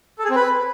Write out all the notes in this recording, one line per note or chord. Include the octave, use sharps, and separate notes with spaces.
A4
G#4
C4
B4